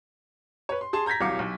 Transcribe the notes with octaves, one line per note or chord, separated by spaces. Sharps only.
B4 C#5
C6
G#4 A5 C6
A#5 G6 G#6 A#6 B6
D#1 C2 F#3 F5 D6 C#7
B1